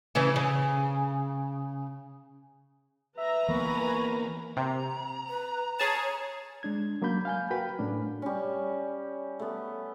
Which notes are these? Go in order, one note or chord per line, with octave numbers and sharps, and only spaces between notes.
C#3 E3 C#4
C#3
B4 E5 A#5
E3 A#3 B3 A#4 G#5 B5 C#6
C3 A#5
B4
G#4 C#5 A5
G#3 D4 G#6
F#3 A#3 C#4 B5 G6
F5 G#5 G6
F#4 A#4 B4 F5 G5 B5
A2 A3 C#4 D4
G3 C#4
A3 B3